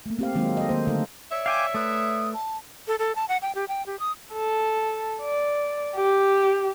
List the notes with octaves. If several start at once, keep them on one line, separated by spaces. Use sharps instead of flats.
A3 A#3
C4 G4 F5
D#3 F#3 G#3 A#3 C4 D#4
A4 D#5
D#3 A#3 C5
D3 A3 D#4 A4
C#5 D5 E5 E6
F5 G5 G#5 D6
A3 B4 D#6
A5
A4
A4
A5
F#5
G5
G4
G5
G4
D#6
A4
D5
G4